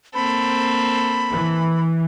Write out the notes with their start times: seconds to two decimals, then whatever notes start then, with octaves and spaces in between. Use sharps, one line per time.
0.15 A#3 C4 A4 B5
1.31 E3